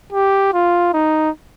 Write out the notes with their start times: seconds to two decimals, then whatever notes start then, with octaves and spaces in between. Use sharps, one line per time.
0.12 G4
0.53 F4
0.94 D#4